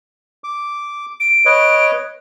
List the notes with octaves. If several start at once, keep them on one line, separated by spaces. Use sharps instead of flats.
D6
D7
B4 C#5 D#5